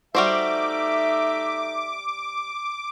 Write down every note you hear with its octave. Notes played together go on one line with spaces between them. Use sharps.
G3 A3 D#4 F#4 C5 E5 D6